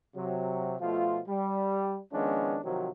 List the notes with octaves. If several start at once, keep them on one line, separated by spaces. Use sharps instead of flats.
C3 F#3
B2 F3 A3 F4
G3
D#3 F3 G#3 B3 C#4 D4
C3 D#3 F3 F#3